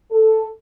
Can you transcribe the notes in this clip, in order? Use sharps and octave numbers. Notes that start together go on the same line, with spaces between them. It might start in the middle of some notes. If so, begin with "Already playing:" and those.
A4